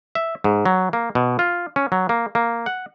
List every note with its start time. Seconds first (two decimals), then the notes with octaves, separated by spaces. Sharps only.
0.15 E5
0.44 G#2
0.65 F#3
0.93 A#3
1.15 B2
1.39 F4
1.76 C#4
1.92 F#3
2.09 A#3
2.35 A#3
2.66 F#5